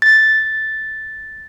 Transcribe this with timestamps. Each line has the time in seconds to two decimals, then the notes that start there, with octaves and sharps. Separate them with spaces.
0.02 A6